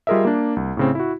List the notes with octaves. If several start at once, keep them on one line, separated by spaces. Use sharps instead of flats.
G3 F4 G#4 A#4 D#5 E5
A#3 D4
C2
A2 C#3 C4
E4 F#4